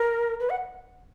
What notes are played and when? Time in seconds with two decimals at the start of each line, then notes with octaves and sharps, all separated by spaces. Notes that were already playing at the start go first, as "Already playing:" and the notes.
Already playing: A#4
0.40 B4
0.50 F#5